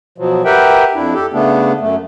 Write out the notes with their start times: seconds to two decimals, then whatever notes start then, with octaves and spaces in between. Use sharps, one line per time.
0.18 B2 F3 F#3
0.45 G4 A#4 B4 E5 F#5 G5
0.94 F2 D4 E4
1.14 G4 A4
1.33 C#3 A3 B3 D4
1.81 F#2 A3